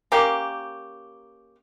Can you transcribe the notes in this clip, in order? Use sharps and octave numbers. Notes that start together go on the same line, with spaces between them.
A#3 C#4 G4